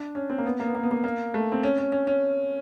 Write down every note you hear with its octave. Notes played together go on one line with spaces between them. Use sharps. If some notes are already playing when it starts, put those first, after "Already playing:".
Already playing: D4
C#4
C4
A#3
B3
A#3
B3
A#3
B3
A#3
A#3
A3
C4
C#4
C#4
C#4
C#4